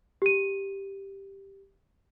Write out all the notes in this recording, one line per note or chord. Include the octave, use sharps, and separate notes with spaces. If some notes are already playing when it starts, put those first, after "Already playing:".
G4 D#7